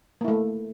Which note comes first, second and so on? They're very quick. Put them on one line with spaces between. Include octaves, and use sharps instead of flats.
A#3 E4 A3